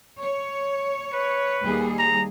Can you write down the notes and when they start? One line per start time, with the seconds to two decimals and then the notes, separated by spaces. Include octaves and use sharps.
0.20 C#5
1.13 B4
1.64 D#2 G3 G#4
1.99 A#5